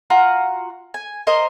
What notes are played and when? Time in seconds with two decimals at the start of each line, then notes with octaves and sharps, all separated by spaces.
0.10 F4 F#4 F#5 A#5
0.94 G#5
1.27 A#4 C5 D#5